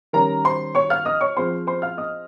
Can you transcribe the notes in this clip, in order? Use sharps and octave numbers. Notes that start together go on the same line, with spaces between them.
D#3 G3 C#4 A#4 A#5
C5 C6
C#5 C#6
F5 F6
D#5 D#6
C#5 C#6
F3 G#3 C4 C5 C6
C5 C6
F5 F6
D#5 D#6